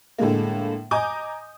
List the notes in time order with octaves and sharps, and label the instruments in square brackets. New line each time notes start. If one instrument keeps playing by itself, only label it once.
[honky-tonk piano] A2 D3 G#3 A#3
D#5 G#5 A#5 D6 D#6 G6